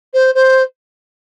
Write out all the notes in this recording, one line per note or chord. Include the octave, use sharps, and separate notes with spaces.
C5
C5